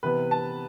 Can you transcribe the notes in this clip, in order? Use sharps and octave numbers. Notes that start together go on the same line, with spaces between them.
C3 E3 B3 B4
A5